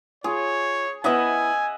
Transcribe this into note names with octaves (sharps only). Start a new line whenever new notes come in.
F4 G#4 C#5
B3 E4 D#5 E5 F#5 G#5